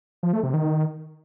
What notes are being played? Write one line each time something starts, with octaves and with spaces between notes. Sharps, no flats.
F3
A3
C3
D#3